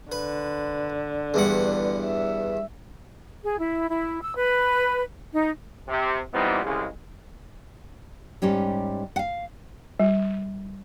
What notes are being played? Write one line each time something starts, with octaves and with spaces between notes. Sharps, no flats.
D3 B4
E2 G2 F#5
E5
G#4
E4
E4
E6
B4
D#4
C3
A#2 E3 G3 B3 C4 D#4
C2 C#3 G#3
G#2 G3 C#4 G4
F5 F#5
G3